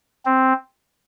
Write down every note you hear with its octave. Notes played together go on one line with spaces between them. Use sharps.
C4